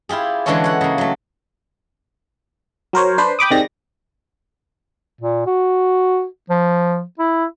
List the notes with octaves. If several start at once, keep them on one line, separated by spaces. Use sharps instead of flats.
E4 F4 G4 G#4
D3 E3 G#3 C#4 A4 C#5
C#5 F#5
C#3 A#3
F#3 A3
F#3 A#4 C5 C#5
D4 B4 C5
G5 B5 D6 D#6
C3 D#3 G#3 G4 D5 A#6
A#2
F#4
F3
E4